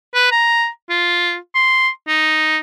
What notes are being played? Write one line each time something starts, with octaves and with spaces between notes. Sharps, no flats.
B4
A#5
F4
C6
D#4